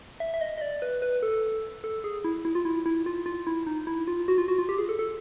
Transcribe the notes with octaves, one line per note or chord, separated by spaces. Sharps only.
E5
E5
D#5
D#5
D5
B4
B4
A4
A4
G#4
E4
E4
F4
E4
E4
F4
F4
E4
D#4
E4
F4
F#4
F4
F#4
F4
G4
G#4
A4
A4